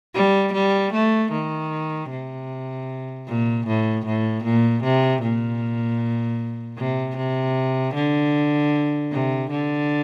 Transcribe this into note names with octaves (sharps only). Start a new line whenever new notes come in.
G3
G3
A3
D#3
C3
A#2
A2
A2
A#2
C3
A#2
C3
C3
D3
C3
D3